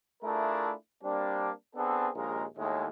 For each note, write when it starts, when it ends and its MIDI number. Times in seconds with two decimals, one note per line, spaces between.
0.23 0.73 57
0.23 0.73 62
0.23 0.73 64
0.23 0.73 65
0.23 0.73 68
0.23 0.73 70
1.04 1.50 55
1.04 1.50 58
1.04 1.50 60
1.04 1.50 62
1.76 2.08 59
1.76 2.08 60
1.76 2.08 62
1.76 2.08 68
1.76 2.08 69
2.15 2.45 34
2.15 2.45 39
2.15 2.45 46
2.15 2.45 56
2.15 2.45 70
2.58 2.87 39
2.58 2.87 45
2.58 2.87 56